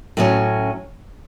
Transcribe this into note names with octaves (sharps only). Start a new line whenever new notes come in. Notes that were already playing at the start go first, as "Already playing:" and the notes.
A2 F#3 C#4